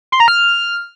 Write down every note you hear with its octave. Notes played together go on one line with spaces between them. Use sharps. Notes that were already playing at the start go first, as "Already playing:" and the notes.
C6
A#5
F6